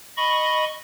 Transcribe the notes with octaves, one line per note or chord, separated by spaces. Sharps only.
D#5 B5 C#6